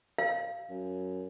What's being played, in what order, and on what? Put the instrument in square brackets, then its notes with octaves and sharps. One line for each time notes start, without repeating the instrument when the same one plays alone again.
[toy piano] F5
[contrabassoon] F#2